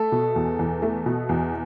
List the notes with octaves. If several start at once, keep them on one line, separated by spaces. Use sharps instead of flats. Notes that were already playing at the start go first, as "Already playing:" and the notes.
Already playing: A3 A4
B2
E2
E2
A3
B2
E2